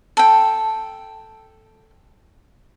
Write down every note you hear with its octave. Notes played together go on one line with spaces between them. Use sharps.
A4 G5